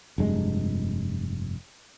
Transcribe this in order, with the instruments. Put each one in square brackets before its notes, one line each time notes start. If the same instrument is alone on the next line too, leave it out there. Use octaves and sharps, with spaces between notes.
[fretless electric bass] F1 G2 G#3